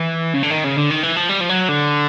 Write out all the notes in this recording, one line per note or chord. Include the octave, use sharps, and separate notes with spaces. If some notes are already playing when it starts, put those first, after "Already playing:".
Already playing: E3
C#3
D3
D#3
C#3
D3
D#3
E3
F3
G3
F3
F#3
D3